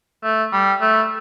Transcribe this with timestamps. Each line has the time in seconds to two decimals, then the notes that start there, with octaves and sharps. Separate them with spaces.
0.24 A3
0.53 G3
0.81 A3